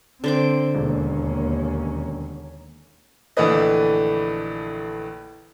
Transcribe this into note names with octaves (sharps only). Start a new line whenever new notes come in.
D3 C4 C5 D6
E1 D#2 A#3 C#4
A#1 D3 E3 A3 B4 D#5